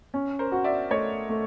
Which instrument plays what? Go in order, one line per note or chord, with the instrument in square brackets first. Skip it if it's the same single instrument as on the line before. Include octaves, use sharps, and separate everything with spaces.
[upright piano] C#4
[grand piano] A#4 C5
[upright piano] F#4
[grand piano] D5 E5
[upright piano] A3 [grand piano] C#5 D#5
[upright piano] A3